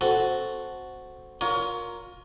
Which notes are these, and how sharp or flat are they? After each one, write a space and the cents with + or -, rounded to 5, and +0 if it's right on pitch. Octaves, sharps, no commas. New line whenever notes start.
C4 +0 F#4 +0 A4 +0
F4 +35 A#4 +5 C#5 +30